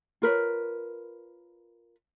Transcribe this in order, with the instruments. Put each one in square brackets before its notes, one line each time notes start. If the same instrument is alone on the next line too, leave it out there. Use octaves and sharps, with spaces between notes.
[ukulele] F4 A#4 B4 C#5